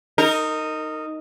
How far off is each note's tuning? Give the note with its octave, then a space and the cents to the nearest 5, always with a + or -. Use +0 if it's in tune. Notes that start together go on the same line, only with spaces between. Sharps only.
D#4 +0 A#4 -25